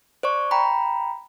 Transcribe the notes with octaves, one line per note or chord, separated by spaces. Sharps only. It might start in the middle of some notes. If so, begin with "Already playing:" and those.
C5 D5 C#6
G5 A#5 B5